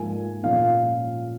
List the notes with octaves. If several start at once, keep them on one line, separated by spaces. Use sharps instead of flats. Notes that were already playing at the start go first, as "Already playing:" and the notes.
Already playing: G#2 F3 A#3 G#5
A#2 F3 A#3 C#4 F5